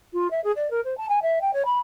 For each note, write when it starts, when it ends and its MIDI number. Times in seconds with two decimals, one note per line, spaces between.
0.13 0.28 65
0.31 0.42 76
0.44 0.51 68
0.56 0.70 74
0.70 0.80 70
0.84 0.97 72
0.97 1.06 81
1.09 1.19 80
1.22 1.39 76
1.41 1.53 79
1.53 1.63 73
1.65 1.78 83